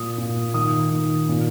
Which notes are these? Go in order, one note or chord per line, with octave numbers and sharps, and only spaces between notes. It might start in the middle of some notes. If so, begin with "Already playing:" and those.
Already playing: A#2 D#6
A#2
D#3 D#6
D#3
A#2